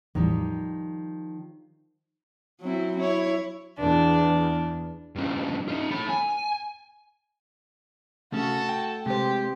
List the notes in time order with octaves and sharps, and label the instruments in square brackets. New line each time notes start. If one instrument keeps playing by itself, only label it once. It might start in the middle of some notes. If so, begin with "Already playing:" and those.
[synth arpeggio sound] A1 E2 A2 [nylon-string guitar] D#3 F3 G3
[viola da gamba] F#3 C4 E4
E4 C#5
[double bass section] E2 [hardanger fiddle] D4
[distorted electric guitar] G2 C#3
D#4 F4
A3 B5
G#5
[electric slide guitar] C3 C#4 [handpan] A3 [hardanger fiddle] F#4 A4
[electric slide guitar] G5
[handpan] C3 C5 [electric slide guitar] G#3 [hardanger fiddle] G4